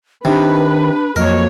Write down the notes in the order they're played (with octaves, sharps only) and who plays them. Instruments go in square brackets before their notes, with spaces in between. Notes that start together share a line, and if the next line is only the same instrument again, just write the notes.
[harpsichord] C3 [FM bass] D#3 [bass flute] D4 [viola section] B4
[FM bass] F2 [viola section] F#3 A#3 C#5 [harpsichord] A#4 [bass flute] D#5